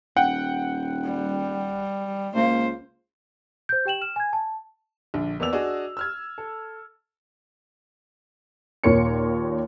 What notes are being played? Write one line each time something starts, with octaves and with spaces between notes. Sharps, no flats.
D#1 F#5 G5
G3
C#2 A#3 C5
C5 G6
G4 G5 E7 F#7
F6 E7
G#5 G#6
A5
A#1 D3
E2 A#3 B3 D5 E6 F7
D4 F#4 G#4 D5 D#5
E6 F6 G#6
A4
D#2 A#2 A#4 C#5 C6 C#7